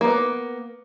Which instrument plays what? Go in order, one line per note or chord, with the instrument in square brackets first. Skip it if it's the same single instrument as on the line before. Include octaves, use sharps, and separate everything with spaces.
[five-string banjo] A#3 B3